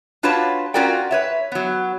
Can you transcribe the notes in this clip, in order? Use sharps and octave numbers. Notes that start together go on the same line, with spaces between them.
D4 F4 F#4 B4 C#5 A5
C#4 F4 F#4 A#4 D5 G5
B4 C#5 E5
F#3 B3